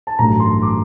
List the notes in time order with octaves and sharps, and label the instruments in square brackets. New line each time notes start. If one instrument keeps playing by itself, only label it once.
[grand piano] A5
A1 G2 F#3 A3 A#5
C6
D6